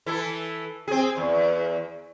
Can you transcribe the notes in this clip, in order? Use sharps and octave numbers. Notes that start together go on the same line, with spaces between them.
E3 E4 A4
C4 G#4
E2